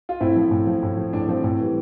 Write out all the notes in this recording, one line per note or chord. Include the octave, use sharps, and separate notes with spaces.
F4
A2 C4 E4
F3
A2
F3
A2
F3
A2 D4
F3 C4
A2 C4
E3 G3